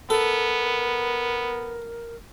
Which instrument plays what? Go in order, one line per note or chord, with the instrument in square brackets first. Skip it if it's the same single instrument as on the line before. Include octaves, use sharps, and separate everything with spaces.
[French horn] B3 [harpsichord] A4 [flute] A#4